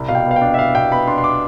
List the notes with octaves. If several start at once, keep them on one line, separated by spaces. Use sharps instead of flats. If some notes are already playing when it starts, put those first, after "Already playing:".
Already playing: C2
B2 F5
G5
B3
F5
G5
D4
E5
C2 F5
B2 G5
B3 B5
D4 C6
C6
D6